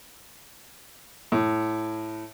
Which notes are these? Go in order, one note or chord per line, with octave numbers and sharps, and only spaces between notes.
A2